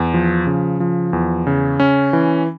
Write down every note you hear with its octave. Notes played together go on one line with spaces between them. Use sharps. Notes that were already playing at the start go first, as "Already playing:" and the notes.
Already playing: E2
F3
C#3
F3
E2
C#3
C#4
E3